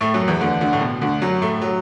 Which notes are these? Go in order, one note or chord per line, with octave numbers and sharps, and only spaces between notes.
A2 A3
F#2 F#3
E2 E3
D2 D3
D2 D3
A2
B2
D2 D3
F#2 F#3
A2 A3
F#3